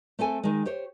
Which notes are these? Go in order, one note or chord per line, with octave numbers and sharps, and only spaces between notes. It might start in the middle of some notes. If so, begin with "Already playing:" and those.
A3 C4 A4 G#5
D#3 G#3
G4 C5 C#5